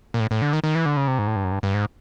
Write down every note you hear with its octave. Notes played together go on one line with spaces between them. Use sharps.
A#2
A2
A2
D3
D#3
D#3
E3
D3
C#3
C3
G#2
A2
G2
F#2
G2
G2
G#2